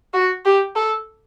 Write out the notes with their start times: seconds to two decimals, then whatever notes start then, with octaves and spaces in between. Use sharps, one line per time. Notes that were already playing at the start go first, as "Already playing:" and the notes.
0.14 F#4
0.45 G4
0.75 A4